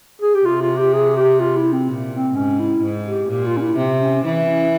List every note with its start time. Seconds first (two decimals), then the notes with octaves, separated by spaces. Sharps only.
0.22 G#4
0.35 G4
0.45 C3 F4
0.62 F4
0.77 G4
0.93 G#4
1.16 G4
1.40 F4
1.57 E4
1.72 C4
1.87 A#2
2.12 C4
2.35 G#2 C#4
2.59 E4
2.83 G#2
3.06 G4
3.30 A#2 G4
3.46 F4
3.57 C#4
3.61 E4
3.77 C3 C4
4.01 C#4
4.24 E3 E4
4.48 C#4